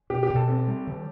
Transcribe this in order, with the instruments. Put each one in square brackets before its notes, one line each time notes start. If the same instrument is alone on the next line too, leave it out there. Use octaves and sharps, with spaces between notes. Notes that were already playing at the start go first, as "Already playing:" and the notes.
[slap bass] B2 [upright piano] G4
[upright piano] G4
[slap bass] B2
[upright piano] A4
[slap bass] C4 [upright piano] A4
[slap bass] G3
D#3